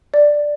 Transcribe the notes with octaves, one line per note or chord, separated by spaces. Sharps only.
D5